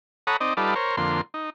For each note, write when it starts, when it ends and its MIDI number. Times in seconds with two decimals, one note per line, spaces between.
0.27 0.37 69
0.27 0.37 73
0.27 0.37 78
0.27 0.37 82
0.27 0.37 83
0.27 0.37 87
0.41 0.54 60
0.41 0.54 63
0.41 0.54 74
0.41 0.54 75
0.57 0.74 55
0.57 0.74 63
0.57 0.74 65
0.57 0.74 69
0.57 0.74 71
0.57 0.74 74
0.75 0.96 70
0.75 0.96 72
0.75 0.96 73
0.97 1.21 41
0.97 1.21 50
0.97 1.21 58
0.97 1.21 84
1.34 1.50 63